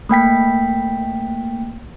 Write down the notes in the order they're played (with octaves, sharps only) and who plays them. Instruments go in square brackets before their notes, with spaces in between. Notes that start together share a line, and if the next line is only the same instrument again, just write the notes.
[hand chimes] A3 A#3 G5 B6